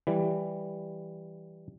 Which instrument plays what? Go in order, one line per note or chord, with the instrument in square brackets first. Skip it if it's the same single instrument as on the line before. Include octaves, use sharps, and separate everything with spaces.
[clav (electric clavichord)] E3 G3